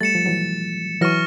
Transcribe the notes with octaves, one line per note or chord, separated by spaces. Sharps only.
G3 A3 A6 C#7 E7
F3
E3 F#3
E3 F#3 C#6 F6 A#6